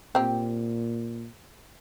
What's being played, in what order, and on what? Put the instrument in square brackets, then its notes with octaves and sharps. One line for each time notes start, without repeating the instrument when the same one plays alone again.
[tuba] A#2 [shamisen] C4 G4